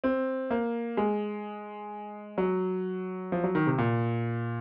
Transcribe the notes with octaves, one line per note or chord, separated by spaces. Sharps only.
C4
A#3
G#3
F#3
F3
F#3
D#3
C3
A#2